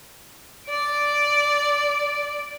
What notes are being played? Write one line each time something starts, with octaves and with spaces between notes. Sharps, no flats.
D5 D7